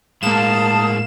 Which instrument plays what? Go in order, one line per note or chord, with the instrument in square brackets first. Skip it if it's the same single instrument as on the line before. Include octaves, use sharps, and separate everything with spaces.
[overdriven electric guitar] A2 G#3 [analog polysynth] A#3 E7 [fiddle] F5 [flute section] A5 D#6